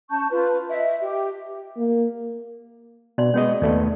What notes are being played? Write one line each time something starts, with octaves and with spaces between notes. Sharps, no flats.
C#4 A5 C#6 G6
F4 B4
D#5 E5
G4
A#3
B2 D4 D5 C6
G#3 B3 C#4 F#4 G#4 D#5
D#2 A3 B3 D5